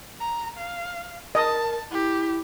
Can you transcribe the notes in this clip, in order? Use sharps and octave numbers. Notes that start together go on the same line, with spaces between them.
A#5
F5
A#4 D#5 A5
E4 G4